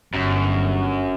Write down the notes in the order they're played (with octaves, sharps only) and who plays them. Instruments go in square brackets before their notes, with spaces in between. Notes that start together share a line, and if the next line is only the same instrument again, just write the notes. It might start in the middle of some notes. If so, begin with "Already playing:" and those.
[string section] G1 [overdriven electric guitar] F#2